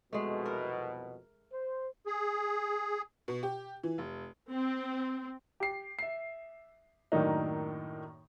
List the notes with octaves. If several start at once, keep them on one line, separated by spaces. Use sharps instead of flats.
C2 F2 B2 G#3 A3
A#4
C5
G#4
B2
G4
E3
F1
C4
G4 C7
E5 C7
F#2 A2 D#3 A#3 D4 D#4